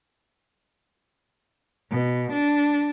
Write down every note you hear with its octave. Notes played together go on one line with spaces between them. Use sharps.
B2
D4